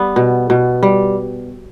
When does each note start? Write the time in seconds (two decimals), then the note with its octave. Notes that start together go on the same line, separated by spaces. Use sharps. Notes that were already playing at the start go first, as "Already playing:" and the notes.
Already playing: G3 B3
0.16 B2
0.50 B2
0.83 G3